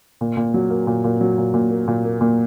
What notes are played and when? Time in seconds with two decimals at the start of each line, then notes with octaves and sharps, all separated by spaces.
0.21 A#2
0.37 A#2
0.54 F#3
0.70 A#3
0.87 A#2
1.04 A#2
1.21 F#3
1.38 A#2
1.54 A#2
1.71 A#3
1.88 A#2
2.05 A#3
2.21 A#2